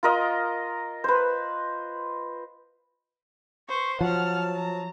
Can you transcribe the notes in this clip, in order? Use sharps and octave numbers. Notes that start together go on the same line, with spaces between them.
F4 A#4 D#5
B4 C5
B4 C5 C#6
F3 F#3 F#5 A5 F6
A#5